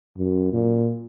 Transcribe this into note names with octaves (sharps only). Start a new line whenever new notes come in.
F#2
A#2